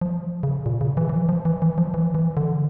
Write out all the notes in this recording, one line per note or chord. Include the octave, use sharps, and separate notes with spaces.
F3
C#3
A#2
C#3
E3
E3
F3
F3
E3
E3
F3
E3
E3
D3